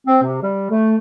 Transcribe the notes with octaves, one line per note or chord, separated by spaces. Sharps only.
C4
C3
G3
A3